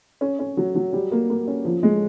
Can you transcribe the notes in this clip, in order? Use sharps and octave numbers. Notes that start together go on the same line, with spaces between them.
C#4
C#4
F#3
F#3
G3
A#3
A#3
C#4
F3
G#3